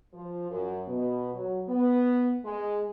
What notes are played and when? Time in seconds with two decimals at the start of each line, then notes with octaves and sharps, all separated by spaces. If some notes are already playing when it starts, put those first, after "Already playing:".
0.12 F3
0.50 F#2
0.87 B2
1.34 F#3
1.68 B3
2.43 G#3